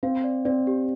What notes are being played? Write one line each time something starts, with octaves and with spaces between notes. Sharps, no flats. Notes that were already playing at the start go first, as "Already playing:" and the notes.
C4 F5
D5
C4 D5
G4